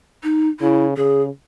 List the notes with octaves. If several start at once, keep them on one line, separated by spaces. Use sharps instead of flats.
D#4
C#3 E4
C#3 G#4